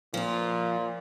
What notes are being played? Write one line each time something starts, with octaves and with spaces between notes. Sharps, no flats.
A#2 F3 F4